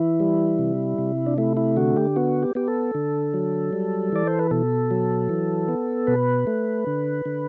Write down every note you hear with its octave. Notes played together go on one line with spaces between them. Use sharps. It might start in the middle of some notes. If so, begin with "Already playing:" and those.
Already playing: E3 E4
G3
C3
C3
D4
A3 E4
E4
D3 F#4
G4
B3 F#4
G4
B3 G4
A4
D3
F#3
G3
E3 D5
C5
B4
B2 A4
F#3
E3
B3
B2 B4
A3
D3
D3